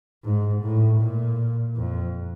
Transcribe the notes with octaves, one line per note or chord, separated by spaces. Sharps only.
G#2
A2
A#2
F2